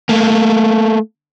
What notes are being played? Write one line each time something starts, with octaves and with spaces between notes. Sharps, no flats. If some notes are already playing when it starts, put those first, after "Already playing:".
A3 A#3